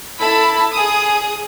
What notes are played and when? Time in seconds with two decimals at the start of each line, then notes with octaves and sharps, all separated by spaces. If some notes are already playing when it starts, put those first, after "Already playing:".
0.21 E4 A4 A5 B5
0.72 G#4 D#6